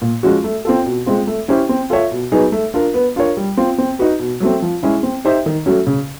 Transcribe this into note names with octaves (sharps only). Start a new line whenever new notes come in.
A#2
F3 G#3 C#4 F#4
A3
C4 F4 A4
B2
G#3 C4 F4
A3
C#4 E4 G4 C5
C4
F4 A4 C#5 E5
B2
F#3 B3 D#4 G#4
A3
D4 F4 A#4
B3
D4 F4 A#4 C#5
G3
C4 F4
C4
D#4 F#4 B4
B2
F#3 A3 C4
F3
G#3 C#4 E4 G#4
C4
D#4 G4 C5 E5
D#3
F#3 A3 C#4 F#4
C#3